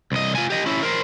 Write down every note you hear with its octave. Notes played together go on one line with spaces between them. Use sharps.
C2 D#5
F4 G#5
G4 D#5
C#4 E4
A#4 C5